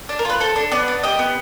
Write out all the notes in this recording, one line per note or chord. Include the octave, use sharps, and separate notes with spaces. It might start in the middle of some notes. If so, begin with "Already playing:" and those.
D4
A#4
F4 B4
A4 C5
D4
B3 D5
D4
G4 D#5
B3